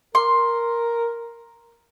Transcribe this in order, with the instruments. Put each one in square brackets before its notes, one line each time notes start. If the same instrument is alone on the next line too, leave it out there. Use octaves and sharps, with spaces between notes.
[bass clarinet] A#4 [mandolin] C6